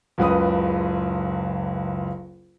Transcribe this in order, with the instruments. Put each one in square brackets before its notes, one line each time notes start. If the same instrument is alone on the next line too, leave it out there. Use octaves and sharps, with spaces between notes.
[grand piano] F#1 C#2 B4 D#6